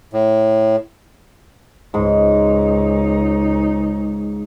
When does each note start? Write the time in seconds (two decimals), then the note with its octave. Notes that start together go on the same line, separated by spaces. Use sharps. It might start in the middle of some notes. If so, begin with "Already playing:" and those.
0.13 A2
1.94 C#2 G#2 D#4